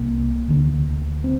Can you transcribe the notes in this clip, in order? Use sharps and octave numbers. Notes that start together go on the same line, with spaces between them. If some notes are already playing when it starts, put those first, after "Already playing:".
Already playing: C2 C3 A#3
D2 D3
C4